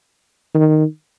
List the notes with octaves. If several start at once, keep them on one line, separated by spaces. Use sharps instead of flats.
D#3